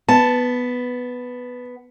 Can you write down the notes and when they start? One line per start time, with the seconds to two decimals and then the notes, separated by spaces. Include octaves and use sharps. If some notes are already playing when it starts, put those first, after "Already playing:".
0.09 B3 A5